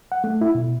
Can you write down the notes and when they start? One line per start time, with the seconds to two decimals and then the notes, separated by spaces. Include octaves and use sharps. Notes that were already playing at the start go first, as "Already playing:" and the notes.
0.12 F#5
0.24 A3
0.41 E4
0.55 B2